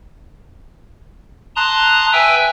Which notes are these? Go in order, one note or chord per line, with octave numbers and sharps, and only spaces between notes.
A5 A#5 C6 D#6 F#6
B4 E5 G5 G#5 E6